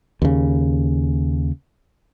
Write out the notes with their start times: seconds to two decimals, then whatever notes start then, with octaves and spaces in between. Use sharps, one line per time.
0.22 D#2 C#3